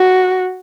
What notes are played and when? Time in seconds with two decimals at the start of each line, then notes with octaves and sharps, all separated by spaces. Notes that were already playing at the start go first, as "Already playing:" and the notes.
Already playing: F#4